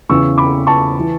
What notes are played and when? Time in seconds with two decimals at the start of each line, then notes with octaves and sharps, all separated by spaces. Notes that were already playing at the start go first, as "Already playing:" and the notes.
0.09 E2 C#3 E3 C#6 E6
0.38 B5 D6
0.67 A5 C#6
1.00 E3